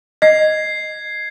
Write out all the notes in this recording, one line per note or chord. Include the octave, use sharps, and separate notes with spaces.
D#5 G#6 C7